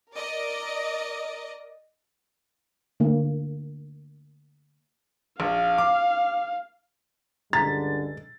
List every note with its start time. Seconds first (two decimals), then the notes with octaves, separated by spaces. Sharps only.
0.13 A#4 D5 D#5
3.00 D3 A#3
5.40 A#1 F5
5.78 D6
7.53 C#2 G2 D3 G#3 A#5 A6 B6